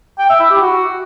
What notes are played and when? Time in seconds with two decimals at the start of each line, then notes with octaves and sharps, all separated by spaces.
0.19 G5
0.30 E5
0.40 E4
0.51 G4
0.61 F#4